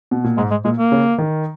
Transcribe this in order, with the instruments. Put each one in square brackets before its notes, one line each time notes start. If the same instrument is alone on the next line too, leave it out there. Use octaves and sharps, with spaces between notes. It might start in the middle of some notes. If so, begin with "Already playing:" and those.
[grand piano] B2
A#2
[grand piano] G#2 [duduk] G#3
[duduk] G#3
[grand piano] A#2 [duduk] G#3
[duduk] A#3
[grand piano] C#3
D#3